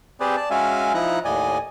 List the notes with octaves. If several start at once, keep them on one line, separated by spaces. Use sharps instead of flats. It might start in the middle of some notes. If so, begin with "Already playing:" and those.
C4 G4 G#4 B4 C5 D5
D5 A5
G#3 C#4 F#4 E5 F5 G#5
F3 D#4 E4 A#5 F#6
D#2 A2 D5 D#5 G#5